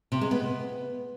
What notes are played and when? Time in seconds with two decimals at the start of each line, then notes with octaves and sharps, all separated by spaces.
0.12 C3
0.21 G#3
0.31 B3